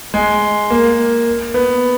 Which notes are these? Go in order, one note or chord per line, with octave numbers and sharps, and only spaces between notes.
G#3
A#3
B3